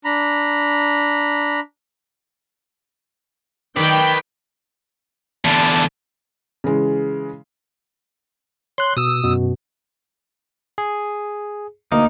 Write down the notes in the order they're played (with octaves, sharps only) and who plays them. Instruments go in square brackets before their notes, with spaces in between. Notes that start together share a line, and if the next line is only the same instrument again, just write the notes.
[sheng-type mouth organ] D4 A#5 B5
[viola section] D#3 G5 [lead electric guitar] B4 D5
[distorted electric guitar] E2 D3 [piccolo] A5
[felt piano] C#3 E3 G#3
[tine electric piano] C#5 [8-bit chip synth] C6 F#6
[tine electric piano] B2 [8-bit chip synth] D#6 E6
[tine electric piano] F#2 B2
G#4
[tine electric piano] D2 [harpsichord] A#3 [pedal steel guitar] D#4